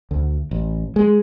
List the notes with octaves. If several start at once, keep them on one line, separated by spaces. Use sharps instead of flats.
D2
A1
G#3